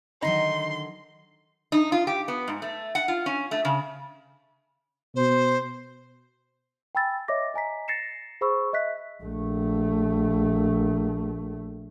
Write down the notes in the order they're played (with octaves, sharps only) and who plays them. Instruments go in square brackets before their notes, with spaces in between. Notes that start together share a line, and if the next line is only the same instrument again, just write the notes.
[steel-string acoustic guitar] D3 D#3 F#3 [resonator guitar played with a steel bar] D#4 [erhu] C6
[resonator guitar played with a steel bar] D#4
F4
G4
B3
G#2
A3
F#5
F4
C#4
A3
C#3
[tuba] B2 [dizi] C5
[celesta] G5 G#5 B5 E6 A6
C#5 D#5 E5 D6 A#6
D#5 G#5 A#5 B6
A6 A#6 C7 C#7 E7
G#4 C5 B5 C#6 E6
D#5 E5 F#6 B6
[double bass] A#1 A3